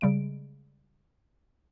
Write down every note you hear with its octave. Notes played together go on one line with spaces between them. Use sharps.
C#3 G3 G#3 D7